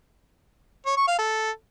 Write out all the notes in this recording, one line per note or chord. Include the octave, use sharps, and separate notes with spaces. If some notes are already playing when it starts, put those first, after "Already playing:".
C#5
C#6
F5
A4